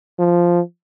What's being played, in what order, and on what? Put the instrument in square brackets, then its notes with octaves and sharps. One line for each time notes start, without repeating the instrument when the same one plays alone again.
[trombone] F3